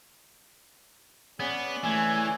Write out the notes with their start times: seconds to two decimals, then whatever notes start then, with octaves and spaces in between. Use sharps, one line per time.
1.40 B3 C#4 G#4 D5
1.84 E3 A3 G#5